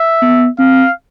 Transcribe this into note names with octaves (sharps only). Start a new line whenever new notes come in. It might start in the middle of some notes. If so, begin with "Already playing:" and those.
Already playing: E5
B3
C4 F5